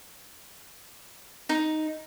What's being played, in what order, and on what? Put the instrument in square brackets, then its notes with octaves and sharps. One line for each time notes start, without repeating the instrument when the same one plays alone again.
[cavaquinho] D#4